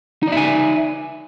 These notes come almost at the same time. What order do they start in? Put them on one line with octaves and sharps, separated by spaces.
D#4 D5 E5 G#5